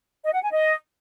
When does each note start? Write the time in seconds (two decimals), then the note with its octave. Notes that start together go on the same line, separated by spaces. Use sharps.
0.24 D#5
0.33 F#5
0.43 G#5
0.52 D#5